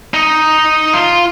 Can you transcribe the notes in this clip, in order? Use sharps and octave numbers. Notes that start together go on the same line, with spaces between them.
D#4
F4